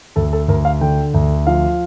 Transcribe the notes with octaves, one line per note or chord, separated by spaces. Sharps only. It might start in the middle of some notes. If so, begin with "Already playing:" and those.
D2 A4
A4
D2 A#4
F5
D3 G5
D2
F3 F5